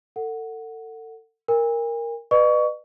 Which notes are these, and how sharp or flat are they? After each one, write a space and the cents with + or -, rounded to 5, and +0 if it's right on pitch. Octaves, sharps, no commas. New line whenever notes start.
A4 +35 F#5 +0
A#4 +0 G#5 -45
B4 +0 D#5 -45 C#6 +25